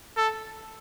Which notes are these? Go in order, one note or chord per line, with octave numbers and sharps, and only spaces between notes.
A4